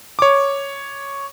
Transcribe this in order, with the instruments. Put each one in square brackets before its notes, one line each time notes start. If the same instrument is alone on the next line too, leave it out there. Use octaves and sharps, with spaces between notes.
[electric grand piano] C#5 D6